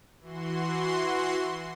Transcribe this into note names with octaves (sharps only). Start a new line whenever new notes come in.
E3 F#4 C6